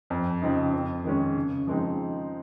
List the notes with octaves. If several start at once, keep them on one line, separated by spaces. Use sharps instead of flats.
F2
C#3 F3 C4 D#4
F2
D#3 G#3 C#4
C#3
F3 G#3 C4 D#4